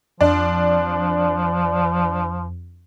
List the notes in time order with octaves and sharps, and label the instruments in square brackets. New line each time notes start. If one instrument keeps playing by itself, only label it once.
[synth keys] F2 [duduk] F3 [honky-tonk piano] D4